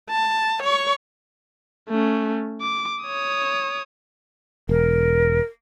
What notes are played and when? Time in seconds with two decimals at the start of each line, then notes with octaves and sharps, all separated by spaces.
0.10 A5
0.63 C#5 C#6
1.89 A3 C#4
2.61 D6
3.03 C#5 D#6
4.69 E1 A#4